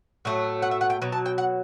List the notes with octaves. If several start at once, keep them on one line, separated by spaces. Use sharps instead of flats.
A2 F#3 A3
F#5
E5
F#5
G5
B2 F#3
A5
G5
F#5